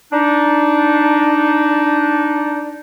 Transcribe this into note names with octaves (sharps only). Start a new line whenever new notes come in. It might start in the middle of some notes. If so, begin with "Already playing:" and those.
D4 D#4